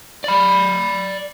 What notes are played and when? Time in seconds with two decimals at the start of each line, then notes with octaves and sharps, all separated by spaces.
0.24 D5 B5